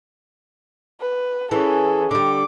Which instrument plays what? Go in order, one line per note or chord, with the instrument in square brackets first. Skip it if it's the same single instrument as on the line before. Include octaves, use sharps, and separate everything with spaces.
[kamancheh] B4
[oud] E3 [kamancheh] C#4 A4 [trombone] G#4
[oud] D3 G3 [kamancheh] D6